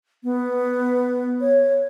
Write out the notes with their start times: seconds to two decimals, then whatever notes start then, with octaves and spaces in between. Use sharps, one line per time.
0.24 B3
1.41 C#5